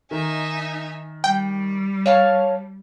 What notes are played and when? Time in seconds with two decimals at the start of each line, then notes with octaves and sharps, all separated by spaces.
0.11 D#3 D#4 E5 G#5
1.24 G3 G5
2.06 C#5 F5 A5